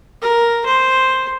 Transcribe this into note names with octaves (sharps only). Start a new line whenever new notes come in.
A#4
C5